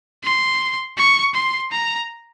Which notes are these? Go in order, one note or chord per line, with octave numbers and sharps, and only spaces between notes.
C6
C#6
C6
A#5